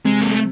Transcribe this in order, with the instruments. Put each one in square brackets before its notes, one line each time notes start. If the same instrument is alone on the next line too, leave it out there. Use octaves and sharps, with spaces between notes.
[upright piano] C3 [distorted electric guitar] G#3
[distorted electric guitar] A#3
A3